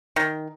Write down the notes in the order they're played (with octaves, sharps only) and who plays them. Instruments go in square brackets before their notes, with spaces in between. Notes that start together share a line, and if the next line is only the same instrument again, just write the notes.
[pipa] D#3